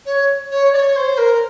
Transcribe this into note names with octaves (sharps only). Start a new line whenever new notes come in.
C#5
C#5
D5
C#5
C5
A#4